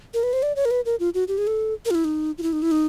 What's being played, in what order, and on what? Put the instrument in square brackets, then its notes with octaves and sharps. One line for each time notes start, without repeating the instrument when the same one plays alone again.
[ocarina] A#4
B4
C5
D5
C#5
A#4
B4
A#4
F4
F#4
G4
G#4
A4
A#4
F4
E4
D#4
F4
E4
D#4
E4
D#4